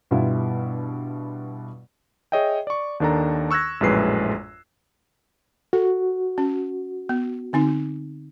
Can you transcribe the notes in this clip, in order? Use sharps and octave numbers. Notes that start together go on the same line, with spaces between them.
G2 B2 G3 B3 E4 F4
G#4 C#5 D#5 E5 G5
D5 C#6
D#2 D#3 D4 A4 A#5
C#6 E6 F#6 G#6 A#6
A#1 F#2 A2 G#3 B4 C7
F#4 A4
C#4
B3
D3 C4 D#4